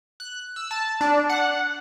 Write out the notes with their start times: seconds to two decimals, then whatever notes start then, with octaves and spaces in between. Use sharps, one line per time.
0.20 F#6
0.56 E6
0.71 A5
1.01 D4
1.29 F#5